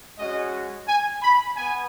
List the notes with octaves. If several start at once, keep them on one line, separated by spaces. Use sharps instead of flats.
G#3 C#4 F#4 D#5
G#5
B5
B3 G#5